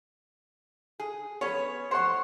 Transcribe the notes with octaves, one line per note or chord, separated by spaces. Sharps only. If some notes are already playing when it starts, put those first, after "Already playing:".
G#4
B3 C#4 C#5
C5 C#5 F#5 C6